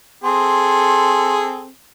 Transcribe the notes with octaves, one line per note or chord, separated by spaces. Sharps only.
C4 G#4 A4 C6